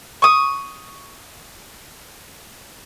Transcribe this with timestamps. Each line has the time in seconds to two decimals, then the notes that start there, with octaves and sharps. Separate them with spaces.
0.22 C#6 D#6